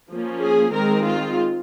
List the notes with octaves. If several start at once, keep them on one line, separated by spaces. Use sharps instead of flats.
F3 A#3 C#4
G#4
D#3 G#3 C4 A#4
F4